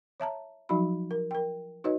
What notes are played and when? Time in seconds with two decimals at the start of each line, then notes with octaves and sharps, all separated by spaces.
0.20 C#5 E5 A5 A#5
0.69 F3 F#3 D#4 F#4 B5
1.11 A#4
1.31 A#4 G5
1.84 D#4 F#4 B4 C#5 D#5